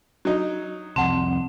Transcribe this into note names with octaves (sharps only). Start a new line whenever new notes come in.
F#3 D#4
C2 F2 C4 F#5 A5 C6